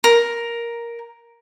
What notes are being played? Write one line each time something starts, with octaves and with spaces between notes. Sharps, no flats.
A#4